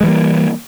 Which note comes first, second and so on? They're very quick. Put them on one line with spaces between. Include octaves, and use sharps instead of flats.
G#3 E3 G3 A#3